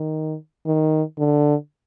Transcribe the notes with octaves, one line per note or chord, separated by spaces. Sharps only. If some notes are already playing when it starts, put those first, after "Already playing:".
Already playing: D#3
D#3
D3